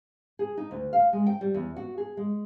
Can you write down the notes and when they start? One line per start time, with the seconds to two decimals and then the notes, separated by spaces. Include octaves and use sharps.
0.39 G#4
0.57 D#4
0.71 D2
0.93 F5
1.13 G#3
1.27 G5
1.41 G3
1.54 E2
1.76 F#4
1.98 G#4
2.17 G#3